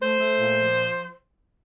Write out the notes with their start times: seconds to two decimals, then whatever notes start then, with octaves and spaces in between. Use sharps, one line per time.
0.01 A3 C5
0.20 A3
0.40 A#2
0.59 F3